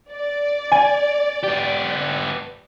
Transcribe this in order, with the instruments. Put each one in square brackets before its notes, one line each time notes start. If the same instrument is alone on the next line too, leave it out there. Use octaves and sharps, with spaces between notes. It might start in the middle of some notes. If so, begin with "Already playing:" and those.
[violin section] D5
[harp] G#5
[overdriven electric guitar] B3 G4